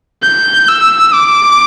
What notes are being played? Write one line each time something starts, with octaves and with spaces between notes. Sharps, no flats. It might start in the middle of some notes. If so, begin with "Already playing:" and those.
G6
E6
D6